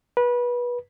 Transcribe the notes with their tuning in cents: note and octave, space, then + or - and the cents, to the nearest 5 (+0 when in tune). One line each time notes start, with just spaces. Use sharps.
B4 -25